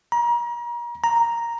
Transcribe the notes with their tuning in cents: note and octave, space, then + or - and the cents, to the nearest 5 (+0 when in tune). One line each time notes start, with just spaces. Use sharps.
A#5 +35
A#5 +0